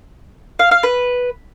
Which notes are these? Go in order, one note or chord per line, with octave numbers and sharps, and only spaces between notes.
F5
F5
B4